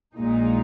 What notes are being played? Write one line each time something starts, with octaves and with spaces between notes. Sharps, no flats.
A#1 A#2 G#3 D#4